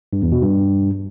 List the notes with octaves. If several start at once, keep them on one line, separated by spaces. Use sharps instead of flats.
G2
E2
B2
G2